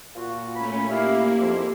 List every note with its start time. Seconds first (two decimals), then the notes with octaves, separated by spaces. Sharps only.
0.16 A#2 F4 F#4
0.56 A3 C#4 B5
0.89 A#3 E4 G4 E5 F5
1.40 F2 G#2 C6